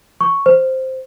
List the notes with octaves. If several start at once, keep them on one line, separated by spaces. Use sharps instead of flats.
C#6
C5